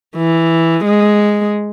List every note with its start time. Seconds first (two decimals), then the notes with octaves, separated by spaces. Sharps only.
0.16 E3
0.84 G#3